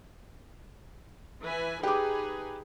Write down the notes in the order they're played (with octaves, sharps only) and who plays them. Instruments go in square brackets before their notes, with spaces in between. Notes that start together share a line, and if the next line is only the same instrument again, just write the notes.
[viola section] E3 B4 G#5
[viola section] D#4 G#4 B4 [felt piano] G4 D6